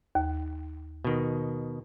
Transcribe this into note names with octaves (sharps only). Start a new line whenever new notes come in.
D#2
B2 D#3